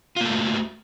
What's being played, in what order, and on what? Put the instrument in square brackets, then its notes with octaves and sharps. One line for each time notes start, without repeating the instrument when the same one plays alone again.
[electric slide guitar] F4
A#3
A4
A3
F#4